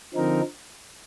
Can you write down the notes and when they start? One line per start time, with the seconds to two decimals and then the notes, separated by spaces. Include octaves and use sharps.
0.14 D3 F3 C4 D#4 A#4